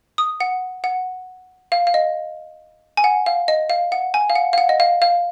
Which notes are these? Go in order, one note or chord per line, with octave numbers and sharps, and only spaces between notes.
D#6
F#5
F#5
F5
F5
D#5
G#5
F#5
F5
D#5
F5
F#5
G#5
F5
F#5
F5
F#5
D#5
F5
F5